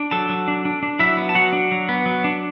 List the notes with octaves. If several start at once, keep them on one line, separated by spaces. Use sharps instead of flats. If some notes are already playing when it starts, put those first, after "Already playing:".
Already playing: D4
F#3 A4 A5
F#3
D4
D4
D4
F#3 E4 E5
B3
A5
F#3 F#4 F#5
D4
F#3
B3
F#3
D4